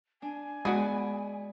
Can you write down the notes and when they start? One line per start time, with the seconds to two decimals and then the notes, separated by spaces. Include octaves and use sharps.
0.22 D4 G#5
0.65 G#3 B3 F#4 G#4 D5 B5 D#6